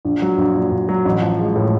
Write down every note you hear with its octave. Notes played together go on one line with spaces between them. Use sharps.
A#1
F#3
A#1
A#2
A#1
F#3
A1
F3
G#3
A2